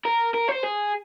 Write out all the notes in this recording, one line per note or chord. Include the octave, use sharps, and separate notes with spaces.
A#4
A#4
C5
G#4